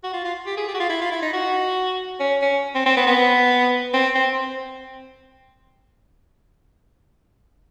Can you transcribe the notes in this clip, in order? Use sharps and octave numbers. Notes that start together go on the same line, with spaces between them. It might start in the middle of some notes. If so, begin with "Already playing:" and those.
F#4
F4
F4
G4
G#4
G4
F#4
F4
E4
F4
E4
D#4
F#4
C#4
C#4
C4
C4
B3
B3
C4
C4